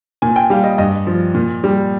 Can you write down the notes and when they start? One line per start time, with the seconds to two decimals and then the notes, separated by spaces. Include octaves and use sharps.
0.22 A#2 G#5
0.36 G5
0.50 G3 F5
0.64 D#5
0.78 G2 D#5
1.07 F3
1.35 A#2
1.64 G3